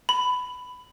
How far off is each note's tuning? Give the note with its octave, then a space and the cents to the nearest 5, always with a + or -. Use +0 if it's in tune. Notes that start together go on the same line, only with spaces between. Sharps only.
B5 +15